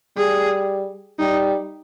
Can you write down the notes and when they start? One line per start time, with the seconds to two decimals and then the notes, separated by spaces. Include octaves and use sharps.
0.17 G3 G#4
1.19 G3 D#4